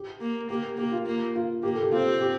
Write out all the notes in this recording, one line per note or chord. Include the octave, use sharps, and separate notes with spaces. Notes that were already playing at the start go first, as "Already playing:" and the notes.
Already playing: G4
A#3
A#3 G4
A#3 G4
F4
A#3
F4
A#3 G4
A4
G4
C4 F4
G4
G4